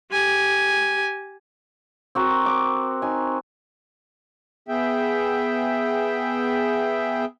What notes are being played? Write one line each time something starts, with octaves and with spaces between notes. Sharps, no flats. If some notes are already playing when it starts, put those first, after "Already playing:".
G4 G#5
C4 F#4 A#4
D6
D#4 G#5
B3 G#4 E5 G5